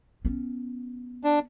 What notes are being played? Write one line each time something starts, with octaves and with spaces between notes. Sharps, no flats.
B3 C#4
D4